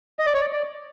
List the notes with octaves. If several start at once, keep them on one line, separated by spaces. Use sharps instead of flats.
D#5
D5
C#5
D5
D5